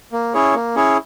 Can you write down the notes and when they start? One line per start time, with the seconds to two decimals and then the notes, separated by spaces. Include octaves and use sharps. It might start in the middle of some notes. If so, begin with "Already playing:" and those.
0.12 A#3
0.34 C#4 E4 G#4 C#5
0.54 A#3
0.76 C#4 E4 G#4 C#5